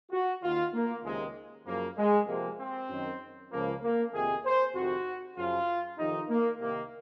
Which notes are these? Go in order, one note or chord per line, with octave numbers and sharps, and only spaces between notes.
F#4
D#2 D#3 F4
A#3
C#2 C3 D#3 G#3
F#2 C#3 F3 A#3
G#3
F2 C3 F3 A#3
C4
F#2 D#3
C#2 C#3 F3 A#3
A#3
F2 C3 D#3 G#4
C5
F2 C3 D#3 F#4
F#2 C#3 F3 F4
F2 C3 D#3 D#4
A#3
C2 C3 D#3 A#3